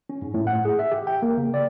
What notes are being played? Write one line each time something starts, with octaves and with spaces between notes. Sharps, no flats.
C#4
G#2
A2
F#5
G#4
E5
G4
G5
A#3
C#3
D5